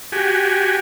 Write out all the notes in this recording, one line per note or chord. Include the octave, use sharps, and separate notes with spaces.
F#4 G4 G#5